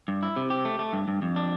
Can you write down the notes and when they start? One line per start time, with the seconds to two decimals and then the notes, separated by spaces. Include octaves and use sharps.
0.08 G2
0.23 E4
0.36 C3
0.50 G4
0.65 A3
0.79 A3
0.93 G2
1.08 G2
1.22 F2
1.36 D4